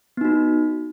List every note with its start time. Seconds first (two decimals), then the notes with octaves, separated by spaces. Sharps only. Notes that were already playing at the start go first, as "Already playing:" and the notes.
0.17 B3
0.21 D#4
0.25 F#4